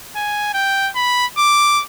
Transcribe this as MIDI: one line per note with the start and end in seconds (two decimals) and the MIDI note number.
0.16 0.51 80
0.54 0.90 79
0.96 1.26 83
1.38 1.83 86